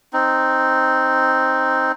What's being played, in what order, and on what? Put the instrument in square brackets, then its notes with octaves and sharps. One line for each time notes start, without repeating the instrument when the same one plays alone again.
[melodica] C4 D#4